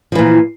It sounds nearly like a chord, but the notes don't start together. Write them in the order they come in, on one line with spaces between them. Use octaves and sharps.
F3 E3 A#2